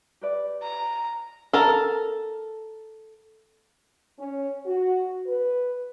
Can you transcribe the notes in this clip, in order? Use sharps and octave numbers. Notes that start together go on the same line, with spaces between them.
G4 B4 D5
A#5
A4 A#4
C#4
F#4
B4